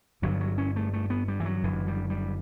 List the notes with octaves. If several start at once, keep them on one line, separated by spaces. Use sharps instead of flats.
G1 G2 D3 F#3
F#3
C#4
A3
A3
B3
G3
E3
F#3
F#1 F#2 D3 E3
G3
G3